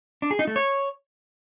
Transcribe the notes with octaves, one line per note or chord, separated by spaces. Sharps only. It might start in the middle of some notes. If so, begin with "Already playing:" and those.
D4
G#4
D#4
A3
C#5